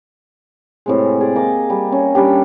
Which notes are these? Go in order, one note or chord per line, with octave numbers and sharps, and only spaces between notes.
A2 C3 G#3
G#4 D5
A#3 D#5 D6
G3
C#4
G3 C#4 D4 G4